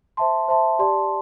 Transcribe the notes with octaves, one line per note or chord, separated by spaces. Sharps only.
C5 E5 A5 C6
C5 E5 A5 C6
G4 D5 A5 C6